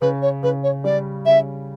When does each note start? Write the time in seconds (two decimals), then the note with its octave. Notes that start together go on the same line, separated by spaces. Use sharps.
0.01 C#3 B4
0.22 C#5
0.43 C#3 B4
0.63 C#5
0.84 G3 D5
1.26 C#3 E5